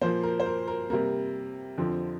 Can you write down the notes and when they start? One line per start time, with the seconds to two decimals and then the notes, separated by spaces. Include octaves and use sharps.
0.01 A#2 F3 A#3 C5
0.23 A#4
0.40 C5
0.46 A#4
0.68 A#4
0.90 C3 G3 A#3 A#4
1.78 F2 D3 F3 C4